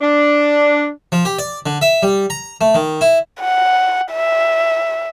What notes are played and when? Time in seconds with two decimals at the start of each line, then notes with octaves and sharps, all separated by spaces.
0.01 D4
1.12 F3
1.25 G4
1.39 D5
1.66 D3
1.81 E5
2.03 G3
2.30 A#5
2.61 A3
2.74 D#3
3.01 E4
3.41 F#5
4.12 E5